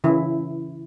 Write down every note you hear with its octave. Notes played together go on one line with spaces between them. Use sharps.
C#3 E3 E4